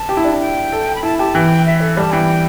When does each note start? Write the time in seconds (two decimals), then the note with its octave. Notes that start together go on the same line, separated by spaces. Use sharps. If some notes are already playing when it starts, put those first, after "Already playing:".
Already playing: A5
0.09 G4
0.17 E4
0.25 D4
0.32 E4
0.40 G5
0.72 A4
0.95 B5
1.03 E4 A5
1.18 G4 A5
1.34 E3 G5
1.66 E5
1.81 A4
1.97 G3 A5
2.12 E3 G5